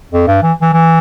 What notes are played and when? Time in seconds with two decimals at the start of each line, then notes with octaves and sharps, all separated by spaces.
0.12 F2
0.27 G2
0.43 E3
0.62 E3
0.73 E3